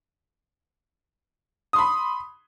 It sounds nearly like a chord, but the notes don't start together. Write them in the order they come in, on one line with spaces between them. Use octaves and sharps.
D#6 C6 B5